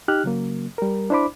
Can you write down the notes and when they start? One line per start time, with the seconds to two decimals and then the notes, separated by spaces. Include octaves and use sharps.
0.08 D#4 G4 F6 F#6
0.24 C#3 F#3 A#3
0.78 G3 A#4
1.10 D4 E4 C5 D5 B5 D6